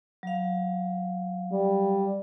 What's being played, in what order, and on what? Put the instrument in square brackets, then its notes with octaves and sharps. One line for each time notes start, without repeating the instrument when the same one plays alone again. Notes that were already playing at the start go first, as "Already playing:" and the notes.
[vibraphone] F#3 F5
[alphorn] G3